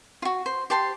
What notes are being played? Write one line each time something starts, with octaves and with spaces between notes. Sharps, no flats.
F4 F#4
C5
G4 C5 A5 C6